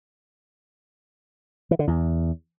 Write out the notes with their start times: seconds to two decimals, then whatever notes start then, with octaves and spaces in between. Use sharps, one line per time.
1.71 E3
1.79 D3
1.87 E2